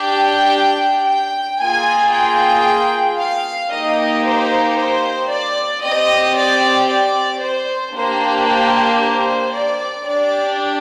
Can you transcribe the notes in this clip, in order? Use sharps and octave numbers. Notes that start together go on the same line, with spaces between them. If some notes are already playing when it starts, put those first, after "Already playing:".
Already playing: D4 G4 G5
G5
A#3 F4 G#4 G#5
G5
F5
A#3 D#4 G4 D#5
C5
C5
D5
C4 G4 D#5
D5
D5
C5
A#3 D4 G4 C5
C5
C5
D5
D4 G4 D5